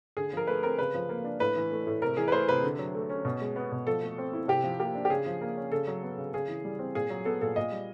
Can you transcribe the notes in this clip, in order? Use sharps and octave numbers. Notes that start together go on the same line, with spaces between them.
D3 G#4
F3 A#4
A3 B4
C4 A#4
C#3 B4
F3
A#3
D4
A2 B4
E3
A3
A2
C3 A#4
E3 G#4
B4
A3 C5
C3 B4
D3
F#3
A3
C#4
B2
G#3
B3
B2
F3 A4
A3
C4
E4
C3 G4
F3
A#3 G4
D4
G4
C#3 G#4
F3
A#3
C#4
C#3 A4
F#3
B3
C#3
C#3 G#4
E3
G3
C4
A#2 G#4
F#3
B3 A4
A#2 A4
A#2 D#5
G3